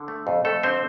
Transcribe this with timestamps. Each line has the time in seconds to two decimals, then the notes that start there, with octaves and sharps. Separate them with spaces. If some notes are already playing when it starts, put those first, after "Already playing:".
Already playing: D3
0.08 A3
0.27 F2
0.45 F2 A3 A4
0.63 D3 C4 C5